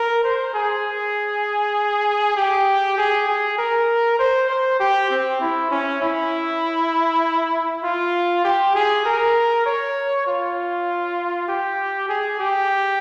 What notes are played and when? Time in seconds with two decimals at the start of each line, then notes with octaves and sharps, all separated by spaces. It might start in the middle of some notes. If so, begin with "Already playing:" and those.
Already playing: A#4
0.24 C5
0.54 G#4
2.37 G4
2.98 G#4
3.28 G#4
3.58 A#4
4.19 C5
4.50 C5
4.80 G4
5.10 C4
5.41 E4
5.71 C#4
6.02 E4
7.84 F4
8.45 G4
8.75 G#4
9.06 A#4
9.66 C#5
10.27 F4
11.48 G4
12.09 G#4
12.40 G4